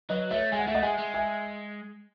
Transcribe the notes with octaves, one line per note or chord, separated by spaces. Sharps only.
F#3 B4 D#5
A3 C#5 E5
G#3 G#5
F#5
A3 E5
D#5 F#5
G#3 E5 G#5
G#3
E5 G#5